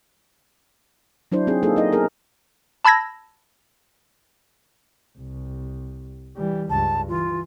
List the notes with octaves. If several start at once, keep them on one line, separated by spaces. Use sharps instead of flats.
F#3 D4 E4 C5
C4 D#4 G#4
A#3 C4 D#4 F4 G#4 A4
D#4 D#5
B3 E4 G#4 A#4
A5 B5 E6 G#6 A#6
C2
E3 G3
C#2 G2 A5
E3 F4